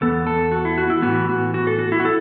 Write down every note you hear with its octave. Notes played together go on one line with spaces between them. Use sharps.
E2 E3 B3 A4
A4
F#4
E4
F#4
E4
A2 E3 B3 F#4
F#4
F#4
A4
F#4
E4
F#4
A4